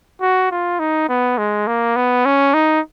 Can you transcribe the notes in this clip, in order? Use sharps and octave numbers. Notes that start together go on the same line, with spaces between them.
F#4
F4
D#4
B3
G#3
A#3
B3
C#4
D#4